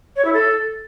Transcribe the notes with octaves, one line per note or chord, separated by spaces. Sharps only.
C#5
E4
A4